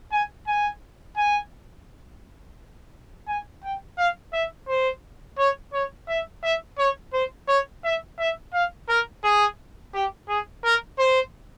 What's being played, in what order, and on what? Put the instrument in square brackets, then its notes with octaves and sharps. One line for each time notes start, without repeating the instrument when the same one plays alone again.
[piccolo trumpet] G#5
G#5
G#5
G#5
G5
F5
E5
C5
C#5
C#5
E5
E5
C#5
C5
C#5
E5
E5
F5
A#4
G#4
G4
G#4
A#4
C5